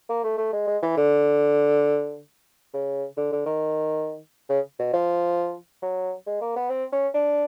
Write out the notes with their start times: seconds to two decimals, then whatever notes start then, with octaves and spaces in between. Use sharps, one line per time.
0.09 A#3
0.24 A3
0.38 A3
0.53 G#3
0.67 G#3
0.82 E3
0.97 D3
2.74 C#3
3.17 D3
3.32 D3
3.46 D#3
4.49 C#3
4.79 B2
4.93 F3
5.82 F#3
6.27 G#3
6.41 A#3
6.56 B3
6.69 C4
6.92 C#4
7.14 D4